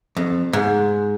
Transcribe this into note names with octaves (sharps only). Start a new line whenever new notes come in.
F2
G#2